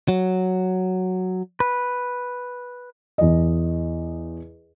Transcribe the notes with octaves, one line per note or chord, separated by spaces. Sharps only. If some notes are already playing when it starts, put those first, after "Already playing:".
F#3
B4
E2 D#5